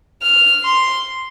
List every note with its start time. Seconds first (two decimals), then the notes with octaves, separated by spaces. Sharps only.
0.23 F6
0.64 C6